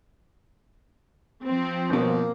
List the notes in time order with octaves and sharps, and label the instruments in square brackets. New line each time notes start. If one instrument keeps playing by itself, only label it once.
[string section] F3 C4
[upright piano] G1 B2 [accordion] A#3